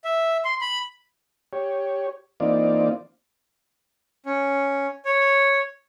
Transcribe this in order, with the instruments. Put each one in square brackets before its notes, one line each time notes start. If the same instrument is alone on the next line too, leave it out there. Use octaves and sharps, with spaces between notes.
[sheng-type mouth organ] E5
C6
B5
[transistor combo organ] G4 C#5
E3 A#3 C4 D#4 F4 D5
[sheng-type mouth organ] C#4
C#5